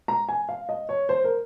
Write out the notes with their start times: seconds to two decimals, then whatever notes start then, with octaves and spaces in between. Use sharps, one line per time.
0.08 A#5
0.29 G#5
0.49 F5
0.69 D#5
0.89 C#5
1.09 C5
1.24 A#4